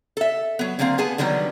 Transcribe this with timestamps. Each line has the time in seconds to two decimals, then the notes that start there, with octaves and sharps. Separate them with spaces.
0.17 A4 E5
0.59 F#3 B3
0.79 D3 F#3 A#3 C4 F5
0.98 B3 G#4 G#5 A5
1.18 D3 D#3 F#3 G3 B3